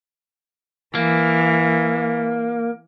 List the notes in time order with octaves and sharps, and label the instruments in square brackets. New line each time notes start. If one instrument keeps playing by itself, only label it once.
[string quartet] E3 [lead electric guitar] A#3